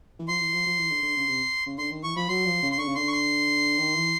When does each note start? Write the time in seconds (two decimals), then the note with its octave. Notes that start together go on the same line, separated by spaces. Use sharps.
0.19 E3
0.28 F3 C6
0.40 E3
0.53 F3
0.66 F3
0.78 E3
0.91 D3
1.03 D3
1.16 C#3
1.28 C3
1.66 C#3
1.78 D3 C6
1.91 D#3
2.03 E3 C#6
2.16 F3 B5
2.28 F#3 C6
2.46 F3
2.63 C#3
2.72 C6
2.78 D3 C#6
2.88 C#3
2.95 D3 C6
3.08 C#6
3.12 C6
3.79 D#3
3.96 E3